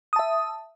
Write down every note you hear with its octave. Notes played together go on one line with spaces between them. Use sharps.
E5 A5 D#6